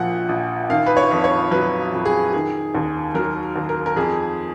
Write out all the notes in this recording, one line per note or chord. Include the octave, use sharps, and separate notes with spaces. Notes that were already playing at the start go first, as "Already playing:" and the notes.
Already playing: A#1 A#2 F3 F#5
A#1
D#3 F5
B4
C#5
F2
C#5
F#3 B4
F2
G#4
D#3 G#4
D#2
F#3 A#4
D#2
A#4
A#4
F2 G#4